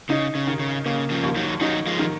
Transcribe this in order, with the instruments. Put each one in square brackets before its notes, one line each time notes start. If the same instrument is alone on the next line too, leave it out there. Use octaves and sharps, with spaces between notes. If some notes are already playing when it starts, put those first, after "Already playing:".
[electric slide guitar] C#3 [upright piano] D#4
[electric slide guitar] C#3
[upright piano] D#3
[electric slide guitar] C#3
[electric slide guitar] C#3 [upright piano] A#3
[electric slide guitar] C#3 F3
[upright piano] D#2
[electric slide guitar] D#3 F#3
[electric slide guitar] D#3 F#3 [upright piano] D#4
[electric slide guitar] F3 G#3
[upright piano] D#3